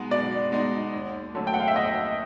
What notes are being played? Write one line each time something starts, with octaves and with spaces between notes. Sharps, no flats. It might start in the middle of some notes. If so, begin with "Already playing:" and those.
Already playing: B2 G#3 B3 D#4 F#4
B2 D5
G#3 B3 D#4 F#4
D#2
D3 F#3 A3 C#4
G5
F#5
F5
E5
D#2 D#5